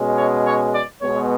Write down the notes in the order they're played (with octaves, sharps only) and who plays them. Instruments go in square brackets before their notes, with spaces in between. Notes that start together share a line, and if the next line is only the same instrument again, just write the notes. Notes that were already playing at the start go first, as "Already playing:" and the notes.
Already playing: [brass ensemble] B2 G#3 C#4
C#5
C#5
D5
B2 G#3 B3 C#5